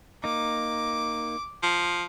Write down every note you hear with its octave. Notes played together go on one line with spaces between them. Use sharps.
A#3 D#4 D6
F3